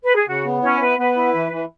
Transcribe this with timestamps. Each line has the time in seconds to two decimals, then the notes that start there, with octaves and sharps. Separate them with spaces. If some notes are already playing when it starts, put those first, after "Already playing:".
0.03 B4
0.15 G#4
0.27 C#3 F#4
0.45 B3
0.63 C#4 E4 C#5
0.80 B3 B4
0.98 B3 B4
1.17 E4
1.34 E3
1.52 E3